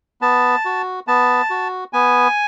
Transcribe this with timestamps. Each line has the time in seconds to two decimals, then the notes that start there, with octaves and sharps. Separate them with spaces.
0.21 B3 A5
0.65 F#4
1.07 B3 A5
1.50 F#4
1.93 B3 G#5